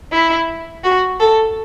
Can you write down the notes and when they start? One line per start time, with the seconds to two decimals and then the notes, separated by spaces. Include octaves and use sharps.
0.12 E4
0.84 F#4
1.20 A4